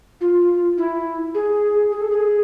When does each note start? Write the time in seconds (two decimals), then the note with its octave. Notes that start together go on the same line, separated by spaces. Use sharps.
0.21 F4
0.78 E4
1.34 G#4
1.92 G#4
2.01 A4
2.11 G#4